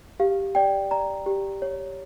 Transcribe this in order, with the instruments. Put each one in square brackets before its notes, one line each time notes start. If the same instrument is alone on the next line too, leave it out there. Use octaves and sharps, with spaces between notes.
[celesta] G4 F5
D5 G5
D5 A#5
G4
C#5